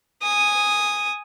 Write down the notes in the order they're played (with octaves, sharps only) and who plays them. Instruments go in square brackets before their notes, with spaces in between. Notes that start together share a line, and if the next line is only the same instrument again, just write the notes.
[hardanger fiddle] G#5 D#6